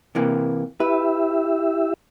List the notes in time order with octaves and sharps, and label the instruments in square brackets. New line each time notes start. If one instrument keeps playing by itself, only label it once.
[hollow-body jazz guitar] C3 E3 A#3
[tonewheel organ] E4 G4 E5 [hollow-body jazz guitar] B4